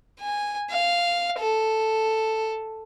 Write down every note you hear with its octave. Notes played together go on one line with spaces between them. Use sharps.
G#5
F5
A4